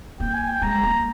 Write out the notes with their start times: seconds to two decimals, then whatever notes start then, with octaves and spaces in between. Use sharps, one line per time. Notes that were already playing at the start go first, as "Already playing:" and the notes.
0.20 A#3 G5
0.34 G#5
0.48 G5
0.62 G#3 A#5
0.83 A#3